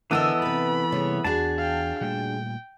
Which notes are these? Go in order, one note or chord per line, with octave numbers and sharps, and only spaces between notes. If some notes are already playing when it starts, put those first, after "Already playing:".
D3 E3 B3 A4 A#4 D#5 G#5 E6
C3 B4 B5
C3 G3 A#3 G#4 C#5
E2 D4 F#4 G#4 A5
F5 G5
A#2 G3 A3 G5